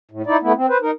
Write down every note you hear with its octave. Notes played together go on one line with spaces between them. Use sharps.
A2
D#4 E4 D5
A3 B3 E4
C4
B4 C5
D#4 A#4